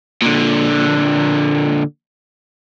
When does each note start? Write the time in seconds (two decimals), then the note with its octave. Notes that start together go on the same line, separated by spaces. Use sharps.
0.22 A#2 D3